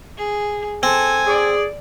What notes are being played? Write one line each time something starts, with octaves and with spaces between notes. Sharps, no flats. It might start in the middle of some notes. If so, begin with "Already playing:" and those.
G#4
C4 A4 G#5
G#4 D5